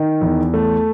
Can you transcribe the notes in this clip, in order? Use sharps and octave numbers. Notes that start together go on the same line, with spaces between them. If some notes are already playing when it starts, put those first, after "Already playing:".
Already playing: D#3
E2
A3